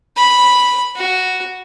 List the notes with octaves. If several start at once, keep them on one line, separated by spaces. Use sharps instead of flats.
B5
F#4